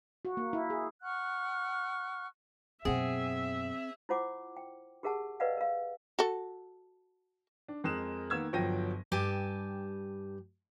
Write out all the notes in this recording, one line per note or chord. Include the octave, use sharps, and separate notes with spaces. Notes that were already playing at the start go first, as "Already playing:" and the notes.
F#4
A#3
E4
G#4
F#5 C#6 F6 F#6
F#2 B2 C4 G#4 E5 F#5
E4 F4 C5 F#5 D6
G5
G4 G#4 A#4 E5 F#5 A5
A#4 B4 D5 D#5 F5 F#5
A#4 F5
F#4 A4
D4
F2 G#3 A#4 D#6 F#6 E7
D#3 A#3 B3 E6 G#6
G1 F3 F#3 G5 A#6 D#7
G2 G4 G#5 A5